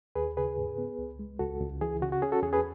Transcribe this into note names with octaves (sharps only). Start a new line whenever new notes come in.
D#2 G#4 B4
C#3 G#4 B4
G#2
B3
C#2
G#3
C#2 F#4 A4
C#2
E3 G#4
C#3 F#4
F#4
C#4 G#4
F#4 A4
E2 G#4
G#4 B4